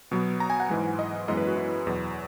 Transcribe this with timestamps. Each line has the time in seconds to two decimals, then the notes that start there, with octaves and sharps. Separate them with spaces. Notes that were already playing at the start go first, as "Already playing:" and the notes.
0.11 B2 F#3 B3
0.40 A#5
0.50 G#5
0.60 F#5
0.70 G#2 E3 G#3
0.99 D#5
1.28 F#2 E3 G#3 B3 D#5
1.37 B4
1.47 F#4
1.57 E4
1.87 E2 B2 F#3